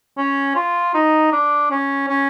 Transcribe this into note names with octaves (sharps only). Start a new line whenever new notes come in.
C#4
F4
D#4
D4
C#4
C#4